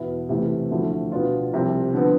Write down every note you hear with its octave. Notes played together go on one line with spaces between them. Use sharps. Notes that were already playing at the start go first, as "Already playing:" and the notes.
Already playing: E2 B2 B3 E4
C3 E3 A3 C4 E4
D2 D3 F3 A3 E4
B2 B3 D4 F4
C2 C3 F3 C4 E4
D3 F3 B3